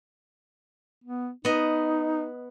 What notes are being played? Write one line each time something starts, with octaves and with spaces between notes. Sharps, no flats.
B3
B3 D#4 D#5